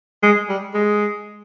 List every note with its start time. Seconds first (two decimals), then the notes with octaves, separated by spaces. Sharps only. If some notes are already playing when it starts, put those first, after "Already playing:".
0.23 G#3
0.49 G3
0.74 G#3